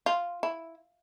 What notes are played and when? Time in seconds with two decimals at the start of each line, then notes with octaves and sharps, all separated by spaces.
0.06 F4
0.43 E4